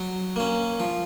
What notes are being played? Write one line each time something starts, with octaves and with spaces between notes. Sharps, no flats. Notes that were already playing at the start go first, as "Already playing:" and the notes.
Already playing: F#3
A#3 C#4
F3